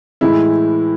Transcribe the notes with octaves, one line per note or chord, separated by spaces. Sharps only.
A2 E3 G#3 E4